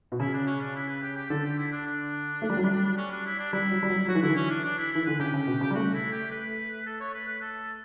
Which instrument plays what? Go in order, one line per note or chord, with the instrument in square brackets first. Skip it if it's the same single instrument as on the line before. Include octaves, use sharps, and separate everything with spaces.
[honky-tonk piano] B2
[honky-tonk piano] C#3 [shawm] E4
[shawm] D4
C#4
D4
E4
B4
G4
G4
[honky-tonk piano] D3 [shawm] A4
[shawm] G4
E4
D4
D4
[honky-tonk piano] A3
G3
F#3
G3
[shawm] C#4
D4
E4
D4
[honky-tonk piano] G3 [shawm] E4
[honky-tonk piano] F#3
G3
F#3
[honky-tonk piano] F#3 [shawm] F#4
[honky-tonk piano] E3
[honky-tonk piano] D3 [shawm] E4
[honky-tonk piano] E3
[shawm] C#4
D4
D4
E4
[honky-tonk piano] E3 [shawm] E4
[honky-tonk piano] D3 [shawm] B4
[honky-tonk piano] C#3 [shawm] G4
[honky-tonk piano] C#3
B2
C#3
G3
[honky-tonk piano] A3 [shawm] F#4
[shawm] E4
G4
B4
A4
C#5
B4
B4
A4